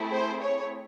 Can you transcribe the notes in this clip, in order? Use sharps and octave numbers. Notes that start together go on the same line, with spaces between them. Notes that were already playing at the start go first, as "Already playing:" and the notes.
Already playing: A3 C4 E4 G#4
C5
C#5